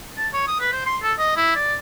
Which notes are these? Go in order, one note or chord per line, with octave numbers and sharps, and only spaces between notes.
A5
C#5
D#6
B4
C5
C6
A4
D#5
E4
D5